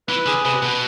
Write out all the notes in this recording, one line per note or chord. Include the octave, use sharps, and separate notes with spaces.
E3 B4
D3 G#4
C3 B4
B2 B4